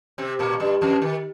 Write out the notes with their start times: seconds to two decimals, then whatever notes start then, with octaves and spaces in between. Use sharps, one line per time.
0.18 C3 C4
0.39 A#2 A#3
0.60 G2 G3
0.81 F2 F3
1.02 D#3